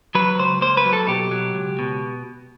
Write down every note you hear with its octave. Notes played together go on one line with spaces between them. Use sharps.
F#3 B4
C#2 C5
A#3 C5
B4
F#3
A4
B2 G4
F#3
C#2
B2